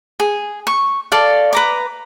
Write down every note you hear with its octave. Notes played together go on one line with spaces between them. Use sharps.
G#4
C#6
A4 D5 F5
B4 A#5 D6